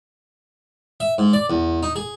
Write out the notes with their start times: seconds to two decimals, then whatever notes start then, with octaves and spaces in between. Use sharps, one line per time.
1.00 E5
1.18 G#2
1.33 D5
1.50 E2
1.83 D#4
1.96 G#4